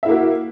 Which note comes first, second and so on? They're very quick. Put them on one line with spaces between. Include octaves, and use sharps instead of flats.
E5 E4 A#3 F#4